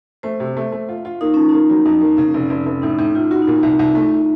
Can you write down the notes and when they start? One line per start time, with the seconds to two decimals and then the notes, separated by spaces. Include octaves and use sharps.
0.23 A3 C5
0.40 C3
0.57 A3
0.72 A3
0.89 F4
1.05 F4
1.21 A#3 D#4
1.34 F3 C#4
1.49 A#3 D#4
1.70 F#3
1.86 F2 D#4
2.01 A#3
2.17 C#3 C#4
2.34 F1
2.50 F1
2.66 F1
2.82 A2 D#4
2.98 A2
3.15 A2 F4
3.31 D#4 F#4
3.42 D#4
3.47 A#2 F4
3.63 C2
3.79 C2
3.95 A3